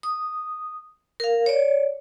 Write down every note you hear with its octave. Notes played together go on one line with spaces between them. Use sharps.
D#6
A#4 F5
C#5 D5